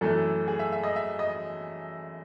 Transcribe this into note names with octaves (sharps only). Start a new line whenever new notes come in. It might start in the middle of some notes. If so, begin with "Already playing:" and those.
F#2 E3 A3 A4
G#4
E5
E5
D#5
E5
D#5